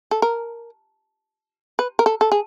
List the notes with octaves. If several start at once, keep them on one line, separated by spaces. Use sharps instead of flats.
A4
A#4
B4
A#4
A4
A4
G#4